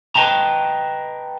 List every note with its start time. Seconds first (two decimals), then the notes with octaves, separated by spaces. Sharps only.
0.16 B4 D#5 G5 A5 A#5